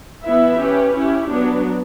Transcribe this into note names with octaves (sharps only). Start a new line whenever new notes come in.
E3 B3 E4 B4 E5
C#4 G4 B4
C#4 E4 G4
F#3 B3 D4